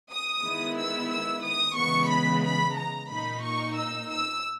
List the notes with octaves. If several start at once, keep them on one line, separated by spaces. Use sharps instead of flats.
D#6
D#3 G#3 B3 E4
E6
E6
D#6
C#3 E3 G#3 B3 C#6
B5
B5
A#5
A#2 A#3 D#4 B5
C#6
E6
E6